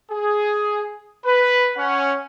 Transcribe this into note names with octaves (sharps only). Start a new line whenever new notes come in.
G#4
B4
C#4 F#5